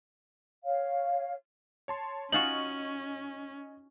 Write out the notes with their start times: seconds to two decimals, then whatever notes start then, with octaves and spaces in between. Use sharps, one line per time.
0.64 C#5 F5
1.88 C#5 A5 C6
2.32 C#4 D#4 F4 F#4 D#5 G#5 C#6 F#7